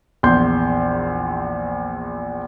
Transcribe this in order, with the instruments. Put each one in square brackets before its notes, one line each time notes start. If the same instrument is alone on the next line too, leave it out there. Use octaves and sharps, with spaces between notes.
[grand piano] A#1 E2 C6 G6